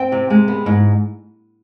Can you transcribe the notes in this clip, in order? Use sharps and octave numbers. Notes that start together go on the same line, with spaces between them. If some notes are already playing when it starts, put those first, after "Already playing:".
Already playing: C4 G5
C3
G#3
B3
G#2